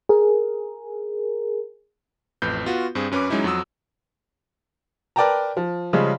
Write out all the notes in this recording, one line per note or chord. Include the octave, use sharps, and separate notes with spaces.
G#4 A#4
A1 F2 B4 G6
B3 F4 F#4 B4
G2 C4 G#4
F#2 C#4 B4 B5 D6
F#3 G#3 C#4 D#4 E4
F2 F#3 F#4 D#6 E6
A#4 B4 D5 G5 A5 A#5
F3
C#3 F3 G3 G#3 C#4